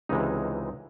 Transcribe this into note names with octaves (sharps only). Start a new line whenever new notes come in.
C#2 C3 E3 G#3 D#4